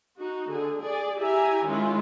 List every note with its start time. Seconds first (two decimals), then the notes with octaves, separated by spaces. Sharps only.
0.18 D#4 F#4
0.52 D3 G#4
0.82 G#4 D5
1.20 E4 G4 E5 G#5 A#5
1.67 D#3 G#3 C#4 E4 F4